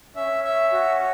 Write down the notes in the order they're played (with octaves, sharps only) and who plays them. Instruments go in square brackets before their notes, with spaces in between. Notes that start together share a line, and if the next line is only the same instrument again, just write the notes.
[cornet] C#4 [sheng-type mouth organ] E5
[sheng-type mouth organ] E5
F#4